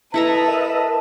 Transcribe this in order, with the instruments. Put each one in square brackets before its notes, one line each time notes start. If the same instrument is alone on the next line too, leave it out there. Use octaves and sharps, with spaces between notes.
[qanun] E4 A4 A#5 [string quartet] B4 [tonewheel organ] D#5 [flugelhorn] A5
[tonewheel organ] A#4 D#5 E5